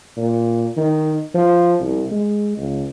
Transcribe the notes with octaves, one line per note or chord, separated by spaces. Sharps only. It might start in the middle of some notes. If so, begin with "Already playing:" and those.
A#2
D#3
F3
C2
G#3
C#2